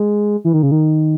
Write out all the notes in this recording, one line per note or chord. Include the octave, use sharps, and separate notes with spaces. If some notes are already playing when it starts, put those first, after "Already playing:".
Already playing: G#3
E3
D#3
C#3
D#3